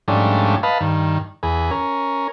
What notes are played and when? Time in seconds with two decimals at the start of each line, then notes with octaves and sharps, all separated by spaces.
0.08 G#2 F3 G3 A3 C#4 D4
0.63 B4 D#5 F5 A5 B5
0.81 G2 D#3
1.43 E2 G#4 B5
1.71 C#4 A#4